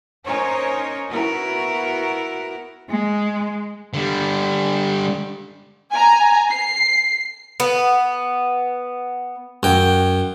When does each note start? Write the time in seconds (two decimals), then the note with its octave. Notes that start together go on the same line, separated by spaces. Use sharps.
0.25 C#4 D#4 A#4 C5 C#5
1.10 B3 E4 F#4 A#4
2.90 G#3
3.94 D3 G3
5.92 G#5 A#5
6.50 C7
7.60 B3
9.63 F#2 G5